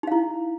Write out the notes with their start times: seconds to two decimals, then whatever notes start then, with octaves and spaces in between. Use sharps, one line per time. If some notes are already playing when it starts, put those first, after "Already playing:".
0.03 D#4
0.07 F5
0.12 E4